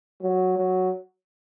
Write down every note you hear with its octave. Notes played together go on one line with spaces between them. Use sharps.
F#3
F#3